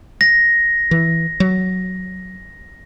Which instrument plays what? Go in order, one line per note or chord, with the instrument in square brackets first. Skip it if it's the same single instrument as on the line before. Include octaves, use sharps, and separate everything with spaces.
[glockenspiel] A#6
[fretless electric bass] E3
F#3